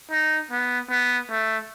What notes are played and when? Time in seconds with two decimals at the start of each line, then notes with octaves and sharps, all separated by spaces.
0.11 D#4
0.51 B3
0.90 B3
1.30 A3